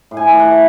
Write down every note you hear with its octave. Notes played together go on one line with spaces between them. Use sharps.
A2
G#5
A2
F#5
A3